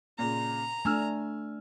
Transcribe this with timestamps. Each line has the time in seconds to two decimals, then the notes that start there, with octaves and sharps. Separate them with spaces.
0.19 A#2 C#3 A#5
0.85 A3 D4 G#5 E6 F6